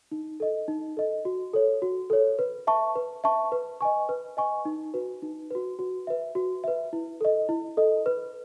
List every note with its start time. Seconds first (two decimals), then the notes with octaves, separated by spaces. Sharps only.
0.12 D#4
0.40 A4 D#5
0.68 D#4
0.97 A4 D#5
1.25 F#4
1.53 A4 C#5
1.82 F#4
2.10 A4 C#5
2.39 B4
2.67 E5 A5 C#6
2.95 B4
3.24 E5 A5 C#6
3.52 B4
3.81 D#5 G#5 C#6
4.09 B4
4.37 D#5 G#5 C#6
4.65 D#4
4.94 F#4 B4
5.22 D#4
5.51 F#4 B4
5.79 F#4
6.07 B4 E5
6.35 F#4
6.64 B4 E5
6.93 E4
7.21 A4 D#5
7.49 E4
7.77 A4 D#5
8.06 B4